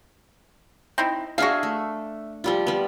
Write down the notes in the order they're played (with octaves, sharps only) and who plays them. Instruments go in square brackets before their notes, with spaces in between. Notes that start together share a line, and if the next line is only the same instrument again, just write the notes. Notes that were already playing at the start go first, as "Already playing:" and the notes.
[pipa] C4 D#4 E4
[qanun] D4 G#4 E5 [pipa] F#4 F5
[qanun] A3
F3 G3 F4
G3 B3